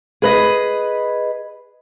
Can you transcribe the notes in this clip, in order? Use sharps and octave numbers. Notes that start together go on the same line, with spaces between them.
G#4 B4 D#5